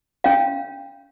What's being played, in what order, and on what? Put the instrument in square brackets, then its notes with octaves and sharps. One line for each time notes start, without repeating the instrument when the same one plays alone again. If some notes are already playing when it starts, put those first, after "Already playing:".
[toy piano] C#4 F5